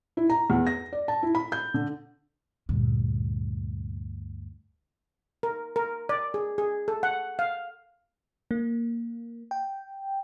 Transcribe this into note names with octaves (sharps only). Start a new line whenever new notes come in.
E4
A#5
E2
A#6
D5
A5
E4
B5
G6
D3
D2 G2 A#2
A#4
A#4
D5
G#4
G#4
A4
F#5
F5
A#3
G5